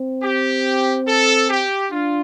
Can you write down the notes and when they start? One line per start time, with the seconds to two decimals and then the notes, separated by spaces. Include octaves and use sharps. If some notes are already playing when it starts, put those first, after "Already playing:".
Already playing: C4
0.23 G4
1.07 A4
1.50 G4
1.91 D4 F4